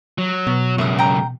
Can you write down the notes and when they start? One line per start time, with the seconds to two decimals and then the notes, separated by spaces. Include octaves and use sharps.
0.18 F#3
0.47 B2
0.78 C#2 F#2 E5 D#6
0.99 G5 A#5